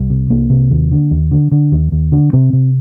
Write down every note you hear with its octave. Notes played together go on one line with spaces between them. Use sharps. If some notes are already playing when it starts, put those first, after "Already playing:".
Already playing: C2 G3
C3
C2 A#3
C3
D#2
D3
D#2
D3
D3
D#2
D#2
D3
C3 C4
C3